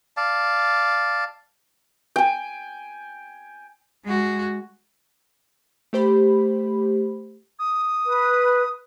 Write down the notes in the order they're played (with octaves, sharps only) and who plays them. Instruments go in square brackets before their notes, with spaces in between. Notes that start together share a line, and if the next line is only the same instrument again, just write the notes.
[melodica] D5 F5 A5
[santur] G5 G#5
[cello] G#3 F#4
[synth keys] A3 G4 C5 B5
[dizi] D#6
[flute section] B4